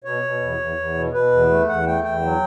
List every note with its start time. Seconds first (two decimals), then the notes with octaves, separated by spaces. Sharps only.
0.04 B2 C#5
0.23 B2
0.40 E2
0.58 E2
0.76 E2
0.94 B2
1.13 B2 B4
1.31 E2
1.49 A3
1.68 E2 F#5
1.86 A3 G5
2.03 E2 G5
2.22 F#3